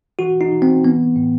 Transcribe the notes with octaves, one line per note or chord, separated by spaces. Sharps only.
E3 F#4
D#4
E3
C4
E3 B3
A2